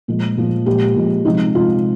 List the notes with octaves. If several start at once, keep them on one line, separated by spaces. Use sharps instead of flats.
A#2 F3 G#3
A#2 F3 G#3
A#2 F3 G#3 G4
A#2 F3 G#3
C3 F3 G#3 D#4
C3 F3 G#3 F4